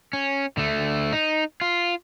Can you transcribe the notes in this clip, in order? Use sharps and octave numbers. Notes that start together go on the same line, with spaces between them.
C#4
D3 A3
D#4
F4